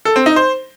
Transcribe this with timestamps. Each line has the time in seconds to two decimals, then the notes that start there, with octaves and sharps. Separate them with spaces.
0.05 A4
0.16 C4
0.26 D#4
0.36 C5